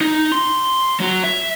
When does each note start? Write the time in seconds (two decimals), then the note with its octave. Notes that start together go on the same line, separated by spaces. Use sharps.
0.01 D#4
0.32 C6
1.00 F#3 F#4
1.24 E5